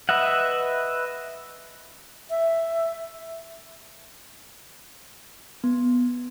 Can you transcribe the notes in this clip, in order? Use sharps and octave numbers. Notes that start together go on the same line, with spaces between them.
B4 D#5 E5 F#5
E5
B3